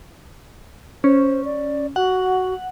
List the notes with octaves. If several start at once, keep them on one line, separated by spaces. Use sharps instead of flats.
C#4 C5
D5
F#4 F#5